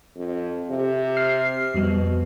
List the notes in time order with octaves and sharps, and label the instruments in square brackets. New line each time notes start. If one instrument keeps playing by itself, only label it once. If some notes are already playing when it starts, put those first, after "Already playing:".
[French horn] F2
C3
[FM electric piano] F6 C7
[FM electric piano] F2 G3 [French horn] B2